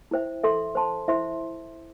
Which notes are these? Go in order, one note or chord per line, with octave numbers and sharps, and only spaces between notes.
E4 C5 E5 G5
A4 E5 C6
C5 A5 C6
E4 C5 E5 C6